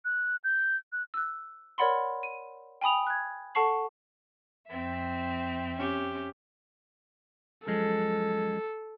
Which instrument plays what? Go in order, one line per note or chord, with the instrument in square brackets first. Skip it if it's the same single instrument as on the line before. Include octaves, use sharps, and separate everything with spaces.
[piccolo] F#6
G6
F#6
[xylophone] E6 F#6
A#4 C#5 D5 F#5 B5 C6
D#7
G5 G#5 B5 D#6 F7
F#6 G#6
A4 F#5 A5 C#6 C7 F#7
[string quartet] F2 C4 E5
[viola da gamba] C#4 G4
[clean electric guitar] F#2 F3 G#3 [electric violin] A4